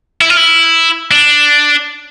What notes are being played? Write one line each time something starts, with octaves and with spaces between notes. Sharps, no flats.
E4
F4
E4
D4